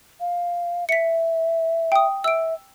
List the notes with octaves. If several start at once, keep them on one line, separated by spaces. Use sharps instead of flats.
F5
E5 B6 C#7
G5 D#6
E5 E6 D7